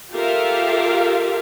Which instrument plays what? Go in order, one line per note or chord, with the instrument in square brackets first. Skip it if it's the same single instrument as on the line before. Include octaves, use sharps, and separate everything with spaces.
[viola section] F4 G4 A4 A#4 E5 F5